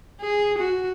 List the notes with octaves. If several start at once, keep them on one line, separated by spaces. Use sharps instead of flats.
G#4
F#4